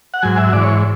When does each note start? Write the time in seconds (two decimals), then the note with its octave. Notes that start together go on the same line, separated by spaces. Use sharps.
0.14 F#5
0.23 G#2 F#3 G#5
0.37 E5
0.53 G#2 E3 D5
0.63 C#5